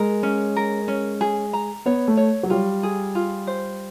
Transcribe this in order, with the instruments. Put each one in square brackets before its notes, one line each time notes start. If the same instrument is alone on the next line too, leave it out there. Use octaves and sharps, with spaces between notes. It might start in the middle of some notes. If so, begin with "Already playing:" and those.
Already playing: [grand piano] G#3 [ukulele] A#4
[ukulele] C#4
A#4
C#4
G#4
A#5
[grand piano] B3 [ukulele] C#5
[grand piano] A3
[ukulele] C#5
[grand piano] F#3
[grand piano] G3 [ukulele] F4
[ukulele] G#4
F4
C5